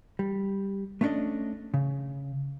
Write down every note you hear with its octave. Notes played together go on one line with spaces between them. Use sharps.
G3
A3 B3 C#4 D4 D5 D#5
C#3